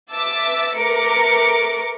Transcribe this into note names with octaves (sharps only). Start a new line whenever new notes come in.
B4 E5 A5 D6 E6 A6
A3 A#4 B4 D6 C#7 D7